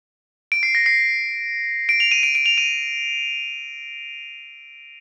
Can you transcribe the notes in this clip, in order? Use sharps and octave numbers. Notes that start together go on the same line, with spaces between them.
D7
C7
A#6
C7
D7
F7
D#7
D7
D7
F7
D#7